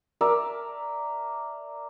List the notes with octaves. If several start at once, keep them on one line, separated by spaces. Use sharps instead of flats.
A#4 D5 E5 A5